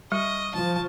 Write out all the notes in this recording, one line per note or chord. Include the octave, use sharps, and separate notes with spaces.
G3 D#5 C#6 F6
F3 A5